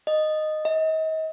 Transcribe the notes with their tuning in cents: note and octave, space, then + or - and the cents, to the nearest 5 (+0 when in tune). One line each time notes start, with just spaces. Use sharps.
D#5 -10
D#5 +35